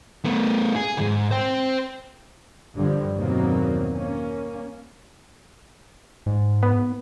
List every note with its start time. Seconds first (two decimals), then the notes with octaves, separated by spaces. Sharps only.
0.25 A3 B3
0.76 G#4
0.98 D#2 G#2
1.31 C5 G5
2.76 G2 D3 F3
3.15 E2 B2 D#3 F#3 A#3 C4
3.92 A#3 C#4
6.26 G#2
6.63 B3